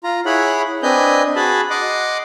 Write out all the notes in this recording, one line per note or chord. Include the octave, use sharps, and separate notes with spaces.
F4 A#5
E4 G#4 C#5 F#5 B5
C4 D4 B4 D#5 G#5 G6
F#4 G#4 A5 B5
D#5 F#5 C6 D6